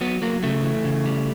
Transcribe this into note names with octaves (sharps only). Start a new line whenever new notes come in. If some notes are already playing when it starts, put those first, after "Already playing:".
F#3 B3
F#3 A#3
C#3 A3
E3
C#3
G3